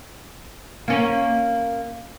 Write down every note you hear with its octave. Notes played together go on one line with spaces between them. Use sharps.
A#3 C#4